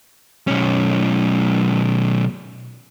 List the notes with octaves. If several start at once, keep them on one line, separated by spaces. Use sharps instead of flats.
B1 C#4